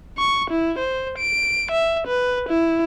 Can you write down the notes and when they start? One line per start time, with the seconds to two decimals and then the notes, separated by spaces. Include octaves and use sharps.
0.18 C#6
0.50 E4
0.79 C5
1.18 D7
1.72 E5
2.07 B4
2.49 E4